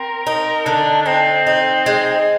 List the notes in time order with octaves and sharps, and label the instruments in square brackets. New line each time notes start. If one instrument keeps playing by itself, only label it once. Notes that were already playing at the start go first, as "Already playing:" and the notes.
Already playing: [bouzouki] C4 [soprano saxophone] A#4
[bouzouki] D#4
[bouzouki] D3 [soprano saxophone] D4
[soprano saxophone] D4
[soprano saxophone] C4 [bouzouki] D#4
[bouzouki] D#4
G#3